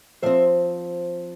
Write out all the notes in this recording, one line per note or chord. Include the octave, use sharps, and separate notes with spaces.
F3 C4 C5 E5